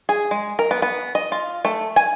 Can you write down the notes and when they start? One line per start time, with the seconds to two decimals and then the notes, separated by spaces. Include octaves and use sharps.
0.09 G#4
0.31 G#3
0.59 A#4
0.71 B3
0.82 B3
1.15 D#5
1.32 F4
1.65 A3
1.96 G#5